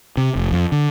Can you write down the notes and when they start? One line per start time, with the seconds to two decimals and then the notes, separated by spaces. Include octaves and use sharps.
0.17 C3
0.35 F1
0.52 F2
0.72 D3